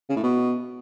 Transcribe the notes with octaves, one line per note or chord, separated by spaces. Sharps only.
C#3
A2
B2